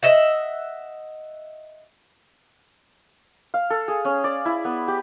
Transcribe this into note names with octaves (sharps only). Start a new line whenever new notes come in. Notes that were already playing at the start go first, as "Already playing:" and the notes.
D#5 E5 F#5
F5
A4
G#4
C#4
D5
E4
B3
G4